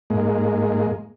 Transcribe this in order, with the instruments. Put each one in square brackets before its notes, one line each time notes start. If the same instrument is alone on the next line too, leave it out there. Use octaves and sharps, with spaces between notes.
[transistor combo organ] G#2 G#3 A#3